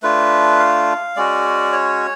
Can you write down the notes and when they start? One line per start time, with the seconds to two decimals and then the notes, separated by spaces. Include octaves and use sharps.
0.03 A3 D4 F4 B4
0.59 F5
1.16 G#3 C#4 F#4 D5
1.73 C#5